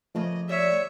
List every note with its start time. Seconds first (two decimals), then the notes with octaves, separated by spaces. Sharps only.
0.15 C#3 F3 A3 A#3 D#5
0.49 D3 G3 C#5 E5